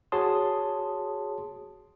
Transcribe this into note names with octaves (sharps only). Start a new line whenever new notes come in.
F#4 G#4 C#5 A5 C6 D#6